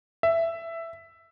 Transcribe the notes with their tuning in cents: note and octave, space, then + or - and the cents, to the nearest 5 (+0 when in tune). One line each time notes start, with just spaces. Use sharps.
E5 +10